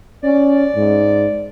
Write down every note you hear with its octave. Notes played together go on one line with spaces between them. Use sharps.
C#4 D5
G#2